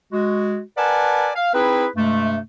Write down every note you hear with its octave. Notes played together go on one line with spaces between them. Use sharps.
G#3 F#4
A#4 B4 D5 F#5 G#5 A5
F5
C4 D#4 E4 G#4 B4
G2 C3 G#3 A3